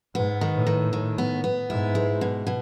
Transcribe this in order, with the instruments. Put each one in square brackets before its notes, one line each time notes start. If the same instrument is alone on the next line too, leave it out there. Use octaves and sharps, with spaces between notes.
[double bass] G#2 [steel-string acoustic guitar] B3
[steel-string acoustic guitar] D#3
[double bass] A2
[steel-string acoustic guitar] D#3
D#3
B3
B3
[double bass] G#2 [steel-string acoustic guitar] E4
[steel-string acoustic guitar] G#3
B2
B2